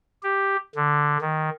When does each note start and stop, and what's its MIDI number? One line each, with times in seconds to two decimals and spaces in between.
0.23 0.56 67
0.76 1.17 50
1.21 1.50 51